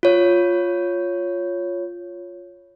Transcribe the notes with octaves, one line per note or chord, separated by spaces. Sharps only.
F4 C#5